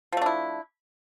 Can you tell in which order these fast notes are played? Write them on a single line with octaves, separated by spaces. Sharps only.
F3 A3 D4 E4